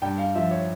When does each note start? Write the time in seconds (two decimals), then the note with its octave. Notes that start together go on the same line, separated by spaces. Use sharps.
0.02 G2 G5
0.18 F5
0.35 F3 E5
0.51 C#5